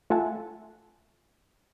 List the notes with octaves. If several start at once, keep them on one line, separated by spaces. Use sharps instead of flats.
A3 F4 E5 F#5 G#5 A5